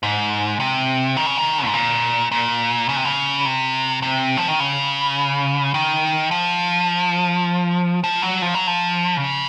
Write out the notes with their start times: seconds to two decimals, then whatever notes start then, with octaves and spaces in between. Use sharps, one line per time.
0.03 G#2
0.60 C3
1.17 D#3
1.26 C#3
1.37 D#3
1.66 G#2
1.74 A#2
2.32 A#2
2.89 C#3
2.96 C3
3.05 C#3
3.46 C3
4.02 C3
4.37 F3
4.48 D#3
4.60 C#3
5.74 D#3
6.31 F3
8.04 F3
8.22 F#3
8.42 F3
8.54 F#3
8.67 F3
9.17 C#3